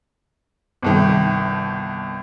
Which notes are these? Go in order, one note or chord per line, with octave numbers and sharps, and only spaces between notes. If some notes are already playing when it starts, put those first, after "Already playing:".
G1 C2 D#3